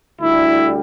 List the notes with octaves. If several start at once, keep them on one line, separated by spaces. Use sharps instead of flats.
D2 D3 G3 E4